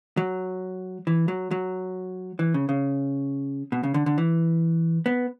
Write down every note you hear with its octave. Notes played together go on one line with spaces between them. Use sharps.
F#3
E3
F#3
F#3
E3
C#3
C#3
B2
C#3
D3
D3
E3
B3